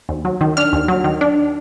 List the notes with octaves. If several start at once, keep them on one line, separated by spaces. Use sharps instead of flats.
D#2
F#3
D#3
D4 F6
D#2
F#3
D#3
D4